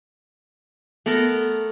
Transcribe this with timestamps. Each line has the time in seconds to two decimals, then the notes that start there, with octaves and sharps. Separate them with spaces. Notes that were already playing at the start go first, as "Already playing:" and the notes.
1.06 A3 B3 A4 A#4